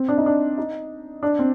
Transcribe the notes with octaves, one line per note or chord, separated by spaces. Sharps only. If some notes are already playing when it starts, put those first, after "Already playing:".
Already playing: C4
D4
D#4
D4
D#4
D4
C4